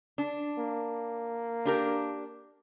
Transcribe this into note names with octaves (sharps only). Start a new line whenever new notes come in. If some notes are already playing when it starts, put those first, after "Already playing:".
D4
A#3
D4 G4 A#4